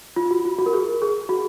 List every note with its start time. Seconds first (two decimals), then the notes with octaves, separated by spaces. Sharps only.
0.16 F4
0.31 F#4
0.45 F4
0.59 F#4
0.66 A#4
0.73 G#4
1.02 G#4
1.29 F#4